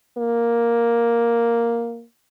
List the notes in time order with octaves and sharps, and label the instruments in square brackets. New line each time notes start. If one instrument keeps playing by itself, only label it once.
[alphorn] A#3